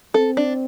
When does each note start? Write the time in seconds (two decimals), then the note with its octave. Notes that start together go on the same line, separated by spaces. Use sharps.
0.14 C4 A4
0.37 D4